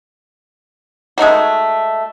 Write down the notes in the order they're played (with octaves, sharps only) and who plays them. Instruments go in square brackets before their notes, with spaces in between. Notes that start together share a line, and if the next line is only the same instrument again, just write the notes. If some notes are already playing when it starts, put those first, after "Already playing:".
[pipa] G#3 A3 D#4 F#4